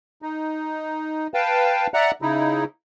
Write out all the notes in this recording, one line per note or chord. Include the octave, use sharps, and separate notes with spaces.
D#4
B4 F5 G5 A5
D5 E5 F#5 A#5 F#6
C#3 D#4 E4